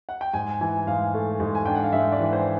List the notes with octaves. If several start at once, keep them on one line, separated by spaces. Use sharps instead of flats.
F#5
G5
G#2 G#5
E3 G#5
G#2 F5
A3
G#2
G#5
D4 G5
F#5
F5
G#2 E5
D5
E3
C5